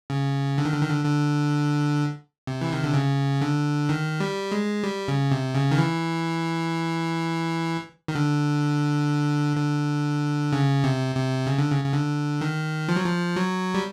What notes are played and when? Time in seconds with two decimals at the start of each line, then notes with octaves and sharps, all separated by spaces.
0.10 C#3
0.58 D3
0.65 D#3
0.73 D3
0.82 D#3
0.89 D3
1.05 D3
2.47 C3
2.61 E3
2.73 D#3
2.84 D3
2.94 C#3
3.41 D3
3.89 D#3
4.20 G3
4.52 G#3
4.84 G3
5.08 C#3
5.31 C3
5.55 C#3
5.71 D#3
5.78 E3
8.08 D#3
8.15 D3
9.57 D3
10.53 C#3
10.84 C3
11.15 C3
11.46 C#3
11.58 D3
11.71 C#3
11.84 C#3
11.94 D3
12.41 D#3
12.89 F3
12.96 F#3
13.05 F3
13.36 F#3
13.74 G3